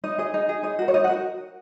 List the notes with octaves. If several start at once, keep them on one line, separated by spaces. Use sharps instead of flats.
D#4 D#5
G#4 D#5
D#4
G#4
D#4 D#5
F#4 A#4
C#5
D#4 D#5
F#5
F#4 A#4